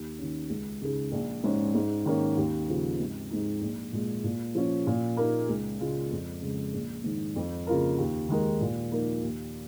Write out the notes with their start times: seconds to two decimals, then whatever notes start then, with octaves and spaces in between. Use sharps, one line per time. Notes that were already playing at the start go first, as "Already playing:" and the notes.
Already playing: D#2
0.19 D#3 C#4
0.50 C#2
0.81 C#3 G#3 D#4 G#4
1.12 A#1
1.44 G#2 G#3 C#4
1.75 G#2
2.05 D#3 A#3 C#4
2.37 D#2
2.68 C#3 F3
2.99 G#1
3.30 G#2 G#3 D#4
3.62 A#1
3.93 A#2 G#3
4.24 A#2
4.55 F3 C#4
4.87 A#2
5.17 A#3 D#4 A#4
5.49 C#2
5.80 C#3 G#3 F4
6.11 F2
6.42 C#3 G#3
6.74 A#1
7.04 G#2 D#3
7.36 F2
7.67 C#3 A#3 F4 A#4
7.98 D#2
8.29 D#3 G#3 D#4 A#4
8.61 A#2
8.91 F3 A#3 D#4 A#4
9.23 D#2